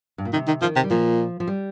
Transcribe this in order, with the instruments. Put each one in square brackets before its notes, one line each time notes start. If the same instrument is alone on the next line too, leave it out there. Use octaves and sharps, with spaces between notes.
[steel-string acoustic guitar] G2
A#2
[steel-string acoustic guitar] C3 [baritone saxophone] D#3
[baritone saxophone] D#3
[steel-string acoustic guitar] D#3 [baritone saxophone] F3
[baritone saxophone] C3
[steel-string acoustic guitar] G3
[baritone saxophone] A#2 [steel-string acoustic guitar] F3
[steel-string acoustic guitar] F3
G3